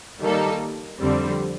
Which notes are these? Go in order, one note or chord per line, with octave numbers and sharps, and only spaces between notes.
D#3 G3 A#3 D#4 A4
F2 D3 G3 C4